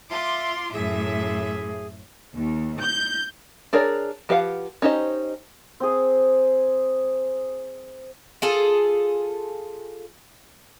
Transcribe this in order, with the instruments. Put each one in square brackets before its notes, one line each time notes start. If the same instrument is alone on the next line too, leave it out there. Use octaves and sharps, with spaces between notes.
[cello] F4 [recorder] E5 [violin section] C6 D6
[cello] F#2 A2 [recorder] G#4 [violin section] E5
[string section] D#2
G6
[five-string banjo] D4 G#4 A#4 C#5 D5
F3 G4 B4 F5 F#5
C#4 D#4 G4 C5 D#5
[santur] C4 G#4
[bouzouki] F4 G#4 A4